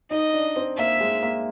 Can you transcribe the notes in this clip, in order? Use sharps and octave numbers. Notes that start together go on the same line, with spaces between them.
D#4 D#5
D4
C4
A#3 E5
G#3
A#3